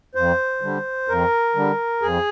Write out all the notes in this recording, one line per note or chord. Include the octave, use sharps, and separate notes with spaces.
F2 C5
D3 G3
F2 A#4
D3 G3
F2 G#4